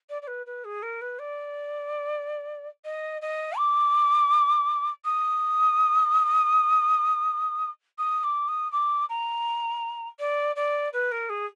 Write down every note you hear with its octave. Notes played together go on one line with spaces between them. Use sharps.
D5
D5
B4
B4
G#4
A#4
B4
D5
D#5
D#5
D6
D#6
D#6
D6
D#6
D6
A#5
D5
D5
B4
A#4
G#4